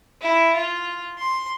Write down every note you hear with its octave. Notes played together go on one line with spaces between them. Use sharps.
E4
F4
C6